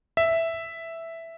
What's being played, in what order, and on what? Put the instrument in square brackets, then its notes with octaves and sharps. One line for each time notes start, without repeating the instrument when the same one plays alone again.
[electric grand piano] E5